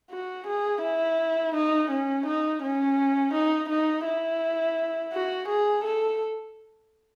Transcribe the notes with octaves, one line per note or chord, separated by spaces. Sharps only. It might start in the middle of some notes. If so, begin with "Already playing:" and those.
F#4
G#4
E4
D#4
C#4
D#4
C#4
D#4
D#4
E4
F#4
G#4
A4